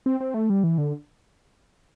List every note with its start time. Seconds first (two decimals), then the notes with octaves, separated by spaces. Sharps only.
0.06 C4
0.20 C4
0.34 A3
0.50 G3
0.64 E3
0.78 D3